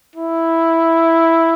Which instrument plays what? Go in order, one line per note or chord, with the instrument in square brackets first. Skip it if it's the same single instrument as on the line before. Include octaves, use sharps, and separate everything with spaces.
[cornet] E4